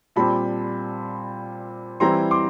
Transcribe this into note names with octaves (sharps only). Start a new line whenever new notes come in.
A#2 G3 C4 A5 B5
E3 G3 C4 E4 A#5 C6
C6 D6